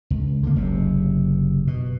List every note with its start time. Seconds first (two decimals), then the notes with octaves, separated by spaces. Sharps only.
0.10 C#2
0.43 D3 D#3 A#3
0.56 F#1 C3
1.67 B2